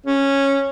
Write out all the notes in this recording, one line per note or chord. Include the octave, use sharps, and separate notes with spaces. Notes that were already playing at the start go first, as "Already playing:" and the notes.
C#4